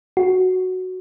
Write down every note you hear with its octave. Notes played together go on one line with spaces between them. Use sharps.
F#4